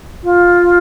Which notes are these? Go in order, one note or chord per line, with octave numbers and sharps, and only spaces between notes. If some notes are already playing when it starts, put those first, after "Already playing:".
F4